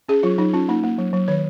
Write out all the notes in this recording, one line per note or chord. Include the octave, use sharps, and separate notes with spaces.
C#4 G#4
F#3 F4
F#3 D#4
C#4 F4
A#3 D#4
A#3
F#3
F#3
D#3 C#5